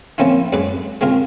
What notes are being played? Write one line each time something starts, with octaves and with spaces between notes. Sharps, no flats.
F3 A#3 C4 C#4 E4 F4
F#2 G#3 B4 D6
G#3 C4 F4 A#4